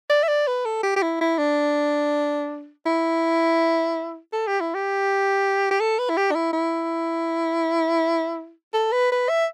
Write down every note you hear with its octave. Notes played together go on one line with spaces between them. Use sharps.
D5
E5
D5
B4
A4
G4
G4
E4
E4
D4
E4
A4
G4
E4
G4
G4
A4
B4
E4
G4
D4
E4
E4
A4
B4
B4
E5